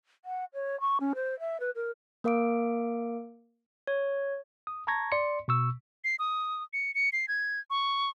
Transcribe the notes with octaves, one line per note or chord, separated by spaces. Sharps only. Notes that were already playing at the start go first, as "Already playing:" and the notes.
F#5
C#5
C#6
C#4
C5
E5
B4
A#4
A#3 A#4 F5 D6 D7
C#5
D#6
A5 A#5 C#6 G#6 A#6
D5 C6 C#7
B2 C#6 E6
C7
D#6
C#7
C#7
C7
G#6
C#6